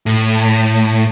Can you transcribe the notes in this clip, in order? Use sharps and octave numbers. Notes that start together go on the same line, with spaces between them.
A2